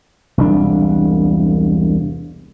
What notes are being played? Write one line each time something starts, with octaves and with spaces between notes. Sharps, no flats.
E1 C2 D4